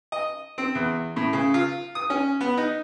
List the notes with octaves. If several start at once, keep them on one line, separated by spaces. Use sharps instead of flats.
D#5
C4
E2
A2
C#3
F4
D#6
C#4
B3
D#4